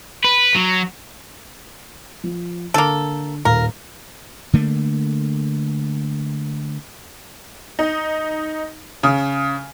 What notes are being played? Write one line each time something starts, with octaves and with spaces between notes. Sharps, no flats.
B4
F#3
F3
D3 A#3 A4
D#1 A#4 F5
D3 A3 A#3
D#4
C#3